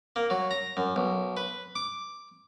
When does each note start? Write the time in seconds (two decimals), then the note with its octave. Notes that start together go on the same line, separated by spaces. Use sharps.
0.16 A#3
0.30 F#3
0.51 A#5
0.77 F#2
0.96 B1
1.37 B4
1.75 D6